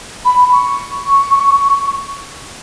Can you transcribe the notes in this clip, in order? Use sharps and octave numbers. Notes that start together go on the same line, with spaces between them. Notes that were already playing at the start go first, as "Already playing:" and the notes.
B5
C#6